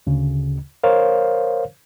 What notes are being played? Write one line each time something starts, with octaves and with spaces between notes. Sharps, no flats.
D2 C#3
A#4 C5 C#5 F5